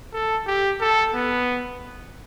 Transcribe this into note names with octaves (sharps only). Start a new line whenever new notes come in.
A4
G4
A4
B3